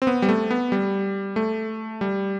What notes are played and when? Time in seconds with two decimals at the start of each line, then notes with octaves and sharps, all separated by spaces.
0.02 C4
0.07 B3
0.22 G3
0.29 A3
0.51 B3
0.72 G3
1.36 A3
2.01 G3